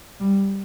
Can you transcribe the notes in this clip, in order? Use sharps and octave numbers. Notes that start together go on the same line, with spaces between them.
G3